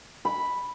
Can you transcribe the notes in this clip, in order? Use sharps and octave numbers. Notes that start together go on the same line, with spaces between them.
B5